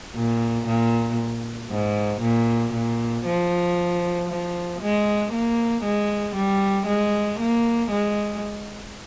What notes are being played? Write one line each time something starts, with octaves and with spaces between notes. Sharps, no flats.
A#2
A#2
G#2
A#2
A#2
F3
F3
G#3
A#3
G#3
G3
G#3
A#3
G#3